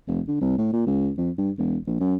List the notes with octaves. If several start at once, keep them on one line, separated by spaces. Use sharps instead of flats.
F1
D3
C2
A2
A#2
C#2
F2
G2
E1
A#1
F#2